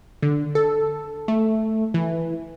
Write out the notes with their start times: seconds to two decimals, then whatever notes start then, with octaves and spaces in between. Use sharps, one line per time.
0.22 D3
0.55 A4
1.28 A3
1.94 E3